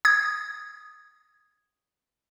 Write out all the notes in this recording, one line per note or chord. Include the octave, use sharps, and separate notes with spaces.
D#6 G#6